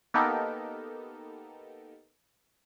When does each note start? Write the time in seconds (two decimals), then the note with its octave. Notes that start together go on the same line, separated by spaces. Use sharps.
0.14 A#3 B3 D#4 G4 A4 A#4